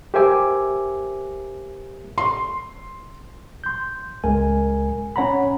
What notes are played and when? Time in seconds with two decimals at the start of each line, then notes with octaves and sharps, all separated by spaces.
0.14 G4 A#4 C5 E5 G#5 D6
2.18 C6
3.64 C6 G6
4.24 C#2 G#3 A#4 G#5
5.16 C#4 C#5 F#5 A#5 B5